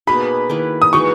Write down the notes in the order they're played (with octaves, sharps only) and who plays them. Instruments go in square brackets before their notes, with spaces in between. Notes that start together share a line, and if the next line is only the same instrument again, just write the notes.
[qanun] B2 A#3 D#4 G#4 [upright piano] B5
[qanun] D#3 A#3 E4 B4
[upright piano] D#6
[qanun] E3 G#3 D#4 F#4 [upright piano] C#6